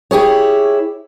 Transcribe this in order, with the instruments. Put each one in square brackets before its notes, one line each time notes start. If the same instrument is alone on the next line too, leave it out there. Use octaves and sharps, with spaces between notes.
[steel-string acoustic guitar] E4 G4 G#4 C#5